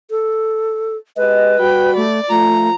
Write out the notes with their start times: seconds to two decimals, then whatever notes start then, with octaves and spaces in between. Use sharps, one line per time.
0.10 A4
1.17 G#3 G4 B4 D#5
1.59 G3 F#4 G5 B5
1.97 A3 D5
2.30 F3 A3 F4 A#5